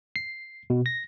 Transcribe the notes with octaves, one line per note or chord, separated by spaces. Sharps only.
C7
B2
A#6